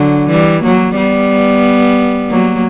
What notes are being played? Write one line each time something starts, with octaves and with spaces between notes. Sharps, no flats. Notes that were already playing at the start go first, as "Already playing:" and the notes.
Already playing: D3 F#3
E3 G3
F#3 A#3
G3 B3
F#3 A#3